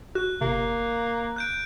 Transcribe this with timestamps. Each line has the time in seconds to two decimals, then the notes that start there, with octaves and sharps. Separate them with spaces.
0.15 F#4 F#6
0.41 G1 C3 A#3
1.36 F#6 G6 D7